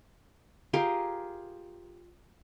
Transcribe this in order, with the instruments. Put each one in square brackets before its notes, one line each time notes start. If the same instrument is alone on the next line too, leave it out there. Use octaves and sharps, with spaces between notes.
[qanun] F4 G4 G#4 A#4